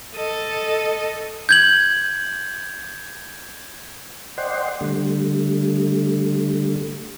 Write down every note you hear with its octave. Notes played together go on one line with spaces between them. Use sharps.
A4 D#5
G6 G#6 F#7
C5 D5 D#5 F#5 G5 C6
D3 G3 A3